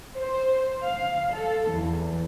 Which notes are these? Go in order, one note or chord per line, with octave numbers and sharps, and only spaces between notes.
C5
F5
A4
E2